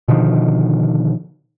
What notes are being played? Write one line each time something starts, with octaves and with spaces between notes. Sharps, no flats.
B2 D3 D#3 F3